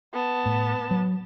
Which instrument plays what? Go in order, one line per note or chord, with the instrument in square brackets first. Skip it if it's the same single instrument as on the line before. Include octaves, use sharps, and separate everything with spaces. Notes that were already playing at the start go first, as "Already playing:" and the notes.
[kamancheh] B3 A5
[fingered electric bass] A2
F#3